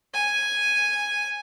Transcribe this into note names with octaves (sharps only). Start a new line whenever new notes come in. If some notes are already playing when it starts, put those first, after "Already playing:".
G#5